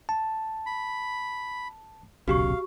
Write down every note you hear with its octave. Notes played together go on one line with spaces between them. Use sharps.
A5
B5
D#1 B1 C#3 F#4 G4 F5 C#6